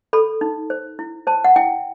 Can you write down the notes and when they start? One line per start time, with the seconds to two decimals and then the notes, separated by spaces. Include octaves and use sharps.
0.13 A4 B5
0.41 D#4
0.70 C5
0.99 E4
1.27 C5 A5
1.44 F#5
1.56 E4 G5